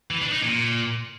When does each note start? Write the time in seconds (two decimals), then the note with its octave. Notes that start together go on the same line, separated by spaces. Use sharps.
0.10 E3
0.21 D4
0.32 D#4
0.43 A#2